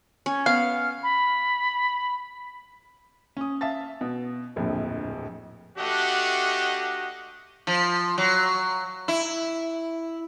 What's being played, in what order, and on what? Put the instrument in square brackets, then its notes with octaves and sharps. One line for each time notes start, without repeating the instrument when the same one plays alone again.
[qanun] C#4
[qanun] B3 [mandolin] F5
[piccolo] B5
[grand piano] C#4 D#6
E5 F5 A5 A6
B2
D1 A#1 F2 A#2
[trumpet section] A3 D4 F#4 G4 D#5 F#5
[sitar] F3
F#3
E4